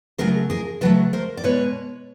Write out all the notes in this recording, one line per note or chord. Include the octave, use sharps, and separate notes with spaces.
C#3 F#3 A3 G#4 A#4
G#4 A#4
C#3 F#3 A3 A4 B4
A#4 C5
D5
B2 G#3 B4 C#5